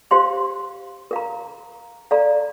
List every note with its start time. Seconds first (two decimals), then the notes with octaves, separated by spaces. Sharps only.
0.11 G4 C5 F5 C6
1.11 A#4 F5 A#5
2.11 A4 D5 F5 A#5